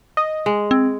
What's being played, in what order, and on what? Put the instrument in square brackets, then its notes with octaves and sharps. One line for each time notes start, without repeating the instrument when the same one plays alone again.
[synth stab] D#5
[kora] G#3
[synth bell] C4